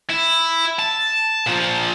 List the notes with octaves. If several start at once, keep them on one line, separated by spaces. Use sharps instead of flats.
E4
A5
A#2 F3